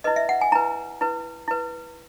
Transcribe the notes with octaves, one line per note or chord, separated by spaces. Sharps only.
E4 B4 D#5
E5
F#5
G#5
E4 B4 A#5
E4 B4
E4 B4